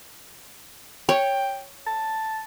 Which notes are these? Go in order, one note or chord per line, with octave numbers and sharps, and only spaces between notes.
C#5 G5
A5